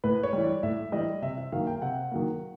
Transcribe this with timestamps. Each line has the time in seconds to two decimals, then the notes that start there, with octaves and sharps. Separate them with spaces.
0.04 A2 B4
0.23 C#5
0.33 E3 G3
0.43 D5
0.63 A2 E5
0.92 E3 G3 D#5
1.22 C3 E5
1.38 E5
1.52 D#3 F#3 A#3 F5
1.67 G5
1.82 C3 F#5
2.11 D#3 F#3 A#3